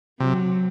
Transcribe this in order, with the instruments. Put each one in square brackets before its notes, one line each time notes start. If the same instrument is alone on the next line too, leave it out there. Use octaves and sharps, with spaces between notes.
[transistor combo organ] C3 [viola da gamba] F#3